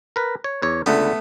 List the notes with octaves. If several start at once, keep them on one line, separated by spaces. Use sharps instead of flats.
A#4 B4
C#5
E2 C#5
C#2 D3 A3 B3